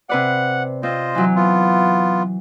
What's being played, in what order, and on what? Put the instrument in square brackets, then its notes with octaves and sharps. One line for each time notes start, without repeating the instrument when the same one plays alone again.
[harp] C3 B4 D5 [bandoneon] F#5
[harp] C4 [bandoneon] F4 C5 D#5
[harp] E3 F#3
[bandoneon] B3 F4